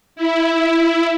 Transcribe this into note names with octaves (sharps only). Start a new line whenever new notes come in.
E4